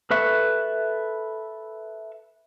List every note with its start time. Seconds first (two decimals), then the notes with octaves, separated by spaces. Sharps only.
0.11 A4 B4 E5 C#6